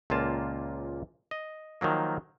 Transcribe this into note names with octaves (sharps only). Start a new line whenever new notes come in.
C#2 A#2 A#3 F4 A5
D#5
D#3 F3 F#3 A#3